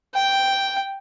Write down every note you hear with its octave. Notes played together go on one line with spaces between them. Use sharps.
G5